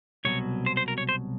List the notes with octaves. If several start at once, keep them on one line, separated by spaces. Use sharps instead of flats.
C2 B2 F#3 C#5
C5
C5
A#4
C#5
C5